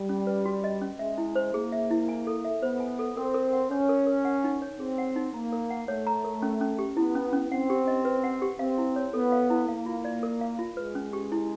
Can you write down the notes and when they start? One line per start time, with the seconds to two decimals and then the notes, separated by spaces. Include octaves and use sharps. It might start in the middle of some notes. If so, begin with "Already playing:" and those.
Already playing: G3
0.09 C#4
0.27 B4
0.45 F#4
0.64 D#5
0.82 C#4
0.99 G#3 E5
1.18 E4
1.36 C5
1.53 A#3 G#4
1.72 E5
1.91 E4
2.09 G#5
2.27 A4
2.45 E5
2.62 B3 C5
2.80 G#5
2.99 A4
3.16 C4 A#4
3.34 A#4
3.53 F#5
3.71 C#4 C#5
3.89 A#4
4.07 A#4
4.25 F#5
4.44 D#4
4.62 C#5
4.80 C4 G#4
4.98 F#5
5.16 D#4
5.34 A#3 A#5
5.52 A#4
5.70 F#5
5.88 A3 C#5
6.07 A#5
6.24 A#4
6.42 C#4
6.61 C#4
6.79 G4
6.97 B3 E4
7.15 C#4
7.33 C#4
7.51 C4 F#5
7.70 G4
7.87 D#5
8.05 B4
8.24 F#5
8.42 G4
8.59 C4 F5
8.78 E4
8.96 C#5
9.13 B3 A4
9.32 F5
9.50 E4
9.68 A#3 F5
9.86 F4
10.04 D5
10.23 A#4
10.41 F5
10.59 F4
10.77 G#3 B4
10.95 C#4
11.13 G4
11.32 E4